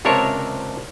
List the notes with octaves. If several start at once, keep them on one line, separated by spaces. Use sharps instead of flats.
C#2 C3 D4 A#4 C#5 E5